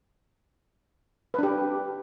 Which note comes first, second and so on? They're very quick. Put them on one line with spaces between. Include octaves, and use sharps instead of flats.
B4 D4 G4